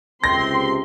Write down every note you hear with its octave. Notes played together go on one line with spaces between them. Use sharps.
C#2 C3 C4 C6 A#6